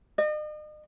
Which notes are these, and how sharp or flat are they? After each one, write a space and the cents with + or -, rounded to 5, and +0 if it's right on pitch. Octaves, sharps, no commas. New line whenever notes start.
D#5 -40